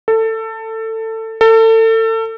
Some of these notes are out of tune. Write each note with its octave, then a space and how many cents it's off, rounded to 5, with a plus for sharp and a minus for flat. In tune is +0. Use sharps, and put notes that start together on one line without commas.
A4 +20
A4 +30